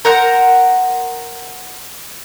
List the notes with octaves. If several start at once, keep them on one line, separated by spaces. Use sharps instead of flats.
A#4 C5 F#5 A#5